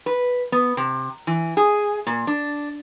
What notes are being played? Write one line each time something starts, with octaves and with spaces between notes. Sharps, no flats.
B4
B3
C3
E3
G#4
A#2
D4